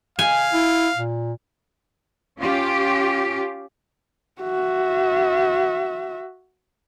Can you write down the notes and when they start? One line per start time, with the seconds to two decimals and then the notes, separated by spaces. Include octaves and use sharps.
0.19 F5 G#5
0.53 E4
0.96 A#2
2.38 C#4 F4 G4
4.41 F#4 E5